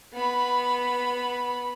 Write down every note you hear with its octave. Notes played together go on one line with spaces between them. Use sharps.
B3 B5